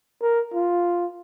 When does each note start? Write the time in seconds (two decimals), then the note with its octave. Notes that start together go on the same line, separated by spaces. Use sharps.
0.21 A#4
0.54 F4